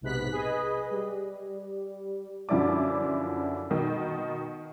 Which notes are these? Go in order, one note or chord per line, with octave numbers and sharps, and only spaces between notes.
B1 G#2 C3 B3 F#6 B6
G#4 B4 D#5
G3
F#2 D3 F3 E4 D5 D6
B2 D#3